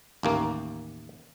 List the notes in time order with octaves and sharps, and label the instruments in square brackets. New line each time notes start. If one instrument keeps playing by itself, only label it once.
[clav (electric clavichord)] A1 D#2 A#3